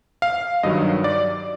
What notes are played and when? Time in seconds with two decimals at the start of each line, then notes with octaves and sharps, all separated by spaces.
0.22 F5
0.63 G2 D#3 F#3 D#5
1.04 D5